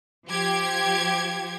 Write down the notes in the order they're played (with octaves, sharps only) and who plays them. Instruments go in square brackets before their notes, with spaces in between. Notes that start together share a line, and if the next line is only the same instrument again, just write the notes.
[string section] F3 G4 G#6